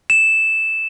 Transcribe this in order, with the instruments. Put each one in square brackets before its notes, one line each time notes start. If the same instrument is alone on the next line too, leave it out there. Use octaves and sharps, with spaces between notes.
[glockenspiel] E7